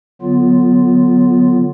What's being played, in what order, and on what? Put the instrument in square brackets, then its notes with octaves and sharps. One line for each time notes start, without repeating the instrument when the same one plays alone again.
[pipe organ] D3 F#3 B3 F4